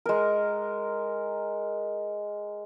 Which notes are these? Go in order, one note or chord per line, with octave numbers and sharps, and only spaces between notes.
G#3 A#4